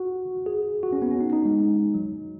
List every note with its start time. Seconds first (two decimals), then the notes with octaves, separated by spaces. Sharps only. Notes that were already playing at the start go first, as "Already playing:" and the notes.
Already playing: F#4
0.46 G#4
0.83 F#4
0.93 C#4
1.02 B3
1.11 C#4
1.20 D#4
1.33 D#4
1.45 G#3
1.94 F#3